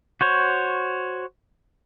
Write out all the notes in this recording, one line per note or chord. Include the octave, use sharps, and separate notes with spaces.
F#4 C5 C#5